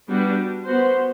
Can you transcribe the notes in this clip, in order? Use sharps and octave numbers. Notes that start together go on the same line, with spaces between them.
G3 B3 D4 F#4
B3 F#4 C5